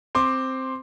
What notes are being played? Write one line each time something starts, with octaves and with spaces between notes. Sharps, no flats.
C4 C6 D6